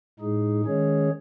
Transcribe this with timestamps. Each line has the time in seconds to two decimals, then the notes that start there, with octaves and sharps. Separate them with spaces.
0.20 A2 G#3 D#4 G#4
0.65 D#3 G#3 C#4 G#4 C#5